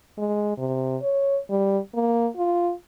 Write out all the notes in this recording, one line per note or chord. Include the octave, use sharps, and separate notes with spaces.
G#3
C3
C#5
G3
A#3
F4